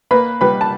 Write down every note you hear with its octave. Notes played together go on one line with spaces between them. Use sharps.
A#3 B4 B5
G3 B4 B5
A5